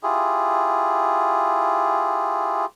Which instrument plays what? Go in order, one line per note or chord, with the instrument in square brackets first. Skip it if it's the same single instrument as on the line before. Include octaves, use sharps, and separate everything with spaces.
[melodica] E4 F4 G4 G#4